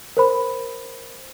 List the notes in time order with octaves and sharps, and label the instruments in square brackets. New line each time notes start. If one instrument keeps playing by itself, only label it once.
[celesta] A#4 C5 B5